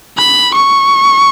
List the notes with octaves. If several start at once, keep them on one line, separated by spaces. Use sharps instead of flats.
B5
C#6